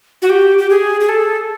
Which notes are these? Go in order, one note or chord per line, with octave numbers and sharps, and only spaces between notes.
F#4
G4
G4
G#4
G#4
A4